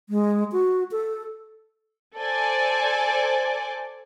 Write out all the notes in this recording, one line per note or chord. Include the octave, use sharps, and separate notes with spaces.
G#3
F#4
A4
A4 C5 D5 G#5